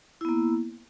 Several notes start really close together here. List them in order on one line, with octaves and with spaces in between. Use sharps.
E4 B3 A#3